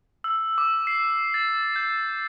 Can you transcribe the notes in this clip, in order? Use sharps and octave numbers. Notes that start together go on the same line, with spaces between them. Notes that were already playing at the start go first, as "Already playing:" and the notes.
E6
D6
C7
A6
G6